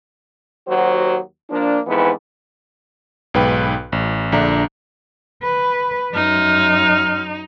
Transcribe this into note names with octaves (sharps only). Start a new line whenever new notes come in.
D#2 F#3 F#4 C5
F3 A#3 D4
F2 G#2 E3 B3
B1 G#2 B4 G5 F#6
A1
A#1 D3 D4 E5 A#5
B4
F#2 D#4 F6